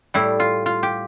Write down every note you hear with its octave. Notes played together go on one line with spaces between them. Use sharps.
A2 G3 E4
F4
F4
G4